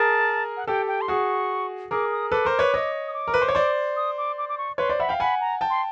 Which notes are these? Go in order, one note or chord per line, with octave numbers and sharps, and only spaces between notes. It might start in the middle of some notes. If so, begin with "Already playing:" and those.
Already playing: G#4 A#4 A5
F#5
G4 A4 G5
G5
C6
F#4 G#4 C#6
G#4 A#4 D6
D#6
A4 B4 D6
A#4 C5
B4 C#5
C#5 D#5
D#6
D6
A#4
B4
C5
C#5
C5 D5
D#6
D6
D6
D6
C#6
B4 C#5 C6
C5 D5
E5 F#5 B5
F5 G5
F#5 G#5 B5
A#5
G5 A5
C6